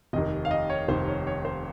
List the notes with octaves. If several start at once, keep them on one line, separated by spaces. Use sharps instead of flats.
F1 D#2 D#3 D#5
F5
D#5
C#5
F1 D#2 D#3 C5
C#5
C#5
C5